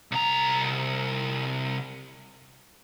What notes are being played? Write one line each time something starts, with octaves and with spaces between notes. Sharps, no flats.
C2 A#5